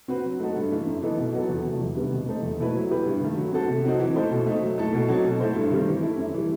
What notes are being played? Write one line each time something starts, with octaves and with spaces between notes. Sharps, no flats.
C4 F#4 B4
F#3
A3 D#4 F#4 A4
G2
E3 A3
F#2
E3 B3 D#4 A4
B2
F#3 B3 F#4 A4
E2
C3 F#3 A3
E2
C3 D#3 G3 B3
B2
A3 D#4 A4 C5
E2
B2 A3 E4 B4
F#3
B3 E4 G4 B4
G2
D#3 A3
F#3
C4 F#4 A4
C3
F#3 C4 D#4 F#4
E3
A3 D#4 A4 C5
B2
A3 D#4
F#3
A3 E4 A4
B2
F#3 C4 D#4 A4
B2
A3 E4 A4 C5
G2
D#3 G3 C4
E3
A3 E4
F#2
E3 G3